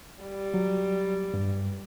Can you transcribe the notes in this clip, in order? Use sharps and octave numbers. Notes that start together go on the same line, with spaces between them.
G3
F#3
G2